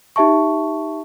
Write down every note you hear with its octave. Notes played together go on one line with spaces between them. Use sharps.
D#4 G4 E5 A5 C#6